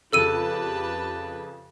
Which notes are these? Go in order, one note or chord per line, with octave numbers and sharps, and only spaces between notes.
F2 C#3 G4 A4 B4 A5 E6 D#7